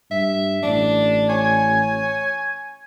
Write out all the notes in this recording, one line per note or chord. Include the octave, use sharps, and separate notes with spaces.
G2 E5
A1 D4
C#5 G#5